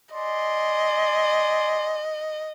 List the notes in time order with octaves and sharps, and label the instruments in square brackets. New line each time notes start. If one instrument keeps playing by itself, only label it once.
[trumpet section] D5 G#5 C6 [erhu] D#5